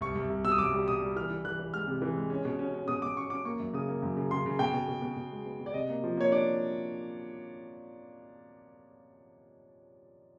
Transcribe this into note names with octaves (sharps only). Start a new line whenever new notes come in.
C2 C#6
C2
C2
B2 E6
D#6
C2 D6
G3
B2 D#6
G3
E3 F6
E3
E3 F#6
E3
G#3 F6
C3
E3
G#3
C#4
B2
C#4
C#4
B2 D#6
B2 D6
C#4 C#6
C#4 D6
A#3 C#6
F#2
C#3 D#6
A#3
F#2
C#3
C#3 C6
C#3
B2 G5
B2
B2
B2
B2
G#3
B3
B2
D5
C3 D#5
A#3
F3
A#3 C#5
D4 D5